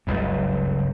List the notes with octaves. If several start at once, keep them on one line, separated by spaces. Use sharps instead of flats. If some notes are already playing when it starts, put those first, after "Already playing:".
F#1 C#2 G2